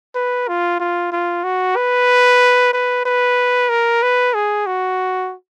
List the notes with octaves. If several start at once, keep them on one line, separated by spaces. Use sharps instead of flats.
B4
F4
F4
F4
F#4
B4
B4
B4
A#4
B4
G#4
F#4